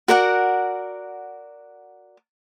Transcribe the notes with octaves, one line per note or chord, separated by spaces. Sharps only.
F#4 A#4 D5 F#5